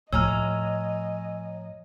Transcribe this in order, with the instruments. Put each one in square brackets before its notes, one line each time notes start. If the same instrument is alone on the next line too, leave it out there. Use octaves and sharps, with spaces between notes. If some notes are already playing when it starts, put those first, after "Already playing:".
[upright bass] A2 F3 [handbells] C#5 G#5 A#5 [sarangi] D#5 [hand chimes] E6 F6